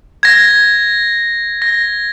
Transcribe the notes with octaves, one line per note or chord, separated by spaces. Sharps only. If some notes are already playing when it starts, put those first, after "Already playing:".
G#6 A#6
A#6